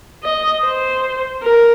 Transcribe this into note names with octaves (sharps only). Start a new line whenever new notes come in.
D#5
C5
A#4